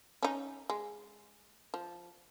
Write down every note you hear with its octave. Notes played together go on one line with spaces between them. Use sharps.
C#4 D#4
G#3
F3